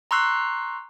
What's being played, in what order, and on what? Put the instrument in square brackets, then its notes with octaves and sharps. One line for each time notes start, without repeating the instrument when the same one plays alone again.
[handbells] A#5 C6 C#6 E6 F#6 C7